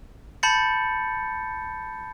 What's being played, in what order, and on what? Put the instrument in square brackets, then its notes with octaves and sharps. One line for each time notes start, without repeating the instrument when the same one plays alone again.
[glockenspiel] A5 B5 G6 A6 C#7